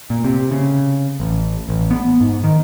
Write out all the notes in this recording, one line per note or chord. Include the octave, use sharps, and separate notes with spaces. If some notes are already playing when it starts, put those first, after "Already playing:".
A#2
C3
C#3
A1
A1
B3
G#2
D#3